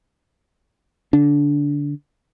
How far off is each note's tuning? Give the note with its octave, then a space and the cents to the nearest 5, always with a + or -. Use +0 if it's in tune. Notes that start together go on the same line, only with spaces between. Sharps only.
D3 -15 D4 -20